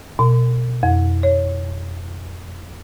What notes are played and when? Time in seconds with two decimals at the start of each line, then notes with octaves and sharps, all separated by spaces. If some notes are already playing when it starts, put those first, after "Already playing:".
0.19 B2
0.83 F2
1.23 C#5